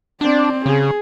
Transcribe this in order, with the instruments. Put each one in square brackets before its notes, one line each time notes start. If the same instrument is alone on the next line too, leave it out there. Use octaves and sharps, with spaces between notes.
[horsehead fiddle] C4 D5 [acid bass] D4
[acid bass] C#3 [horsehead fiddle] G#4